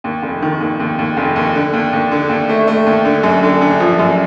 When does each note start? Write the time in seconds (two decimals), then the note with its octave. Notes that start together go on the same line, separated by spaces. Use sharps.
0.04 D#2
0.23 F1
0.42 D#3
0.60 D#2
0.80 D#2
0.98 D#2
1.17 F1
1.36 D#2
1.55 D3
1.73 D#2
1.93 D#2
2.11 D3
2.29 D#2
2.49 A3
2.67 A3
2.86 D#2
3.05 D3
3.24 F#2
3.43 D3
3.61 D3
3.80 F3
3.99 F#2